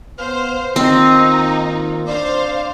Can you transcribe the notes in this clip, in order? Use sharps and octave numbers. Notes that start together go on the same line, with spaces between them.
B3 C5 F5 F6
D#3 A#3 C4 D#4 F4
D4 C5 D5 F5